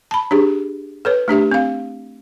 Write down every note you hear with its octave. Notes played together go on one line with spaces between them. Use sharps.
A5 B5
D4 G4 G#4
A4 B4 C#5
A3 D4 G4 E5
C4 F5